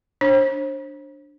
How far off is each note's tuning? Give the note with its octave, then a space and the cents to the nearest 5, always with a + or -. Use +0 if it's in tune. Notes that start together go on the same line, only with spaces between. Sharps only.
D4 +0 C5 +40